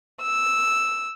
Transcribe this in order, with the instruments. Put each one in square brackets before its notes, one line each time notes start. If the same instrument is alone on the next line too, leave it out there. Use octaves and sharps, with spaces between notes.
[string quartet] E6